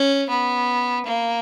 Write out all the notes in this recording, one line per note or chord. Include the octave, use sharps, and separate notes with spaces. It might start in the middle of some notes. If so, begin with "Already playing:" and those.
Already playing: C#4
B3
A#3